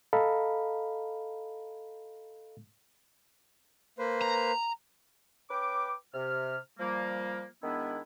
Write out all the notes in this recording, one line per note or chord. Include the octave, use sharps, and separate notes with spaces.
A4 D#5 F5 A#5 B5
A#3 B4 C5
A#5
C#4 B4 G5 D6
C3 F6
F3 G3 A#3
D#3 G#3 B3 D4 E4